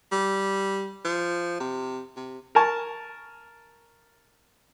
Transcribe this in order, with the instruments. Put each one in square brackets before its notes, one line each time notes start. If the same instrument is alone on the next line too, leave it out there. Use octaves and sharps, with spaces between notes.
[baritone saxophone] G3
F3
C3
C3
[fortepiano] A#4 G#5 A5 C#6